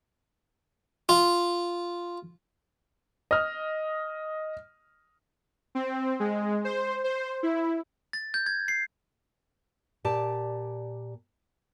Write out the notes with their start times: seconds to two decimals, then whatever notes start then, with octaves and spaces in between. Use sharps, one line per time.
1.09 F4
3.31 D#5 F6
5.75 C4
6.20 G#3
6.65 C5
7.04 C5
7.43 E4
8.13 A6
8.34 G6
8.46 G#6
8.68 C7
10.05 A#2 G4 D5 A5